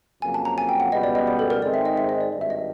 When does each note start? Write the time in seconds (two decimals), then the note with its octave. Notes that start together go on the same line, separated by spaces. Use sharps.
0.22 F2 C#3 F#3 A#3 G#5
0.34 A5
0.45 A#5
0.58 G#5
0.69 G5
0.80 F#5
0.92 C#2 B2 G3 B3 D#5
1.04 D5
1.15 D#5
1.27 D5
1.39 A4
1.50 A#4
1.62 G#2 D#3 G#3 C4 D5
1.74 E5
1.85 D#5
1.97 E5
2.09 D#5
2.21 D5
2.32 G#1 G2 D#3 D5
2.41 E5
2.50 D#5